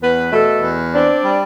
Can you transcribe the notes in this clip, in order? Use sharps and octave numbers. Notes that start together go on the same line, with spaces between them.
E2 B3 B4
B2 A3 A4
E2
C4 D4 D5
G3